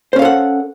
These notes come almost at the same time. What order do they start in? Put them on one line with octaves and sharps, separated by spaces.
C5 C#4 F5 A4 F#5